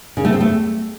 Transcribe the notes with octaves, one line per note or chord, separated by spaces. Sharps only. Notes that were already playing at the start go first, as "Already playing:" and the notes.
C#3
A3
C4
A3